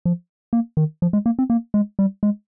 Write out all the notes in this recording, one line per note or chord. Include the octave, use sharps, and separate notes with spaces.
F3
A#3
D#3
F3
G#3
A#3
C4
A#3
G#3
G3
G#3